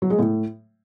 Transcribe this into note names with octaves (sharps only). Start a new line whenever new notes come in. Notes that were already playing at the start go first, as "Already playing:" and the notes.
F#3
G#3
A2